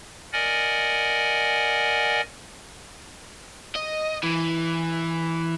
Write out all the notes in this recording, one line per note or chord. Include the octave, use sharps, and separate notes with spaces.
A#4 D5 D#5 F#5 G#5
D#5
E3